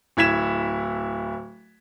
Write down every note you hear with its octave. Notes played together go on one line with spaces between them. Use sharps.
D1 E4 G#6 B6 E7